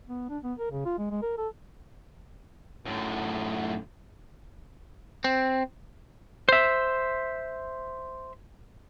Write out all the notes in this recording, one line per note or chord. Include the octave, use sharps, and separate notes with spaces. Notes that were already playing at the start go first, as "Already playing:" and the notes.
B3
D4
B3
A#4
C#3
F4
G#3
G#3
A#4
A4
F#2 A2
C4
C5 E5